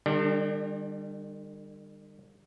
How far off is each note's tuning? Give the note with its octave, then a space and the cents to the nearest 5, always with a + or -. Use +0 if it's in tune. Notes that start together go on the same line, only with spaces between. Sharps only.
D#3 -45 G3 +25 D4 +0